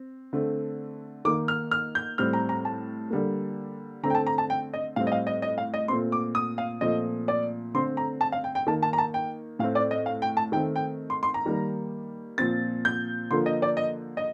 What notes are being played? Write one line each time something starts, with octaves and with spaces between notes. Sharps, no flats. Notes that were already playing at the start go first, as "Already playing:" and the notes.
Already playing: C4
D3 A3 C4
D#3 A#3 D6
F6
F6
G6
A2 G3 C4 F6
A#5
A#5
A5
D3 G3 A#3
D3 A3 C4 A#5
G5
A5
A#5
A5
G5
D#5
A2 G3 C4 F5
D#5
F5
D#5
D#5
F5
D#5
A#2 A3 C4 C6
D6
D#6
F5
A#2 F3 A3 C4 D#5
D5
D3 A3 C4 C6
A#5
A5
F5
G5
G5
D#3 A#3 A5
A5
A#5
A5
G5
A2 A3 C4 F5
D5
D#5
F5
G5
A5
D#3 A3 C4 G5
G5
C6
C6
A#5
D#3 G3 A#3
A#2 F3 C4 A6
G6
D3 F3 A#3 C6
D#5
D5
D#5
D#5